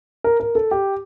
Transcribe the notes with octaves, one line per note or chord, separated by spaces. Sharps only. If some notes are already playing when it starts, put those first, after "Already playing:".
A#4
A#4
A4
G4